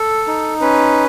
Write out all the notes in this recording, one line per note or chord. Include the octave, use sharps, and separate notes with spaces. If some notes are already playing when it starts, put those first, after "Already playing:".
Already playing: A4
D#4
C#4 B4